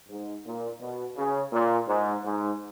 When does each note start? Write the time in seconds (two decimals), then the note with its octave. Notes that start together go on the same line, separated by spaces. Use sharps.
0.08 G#2
0.45 A#2
0.80 B2
1.16 C#3
1.52 A#2
1.88 G#2
2.24 G#2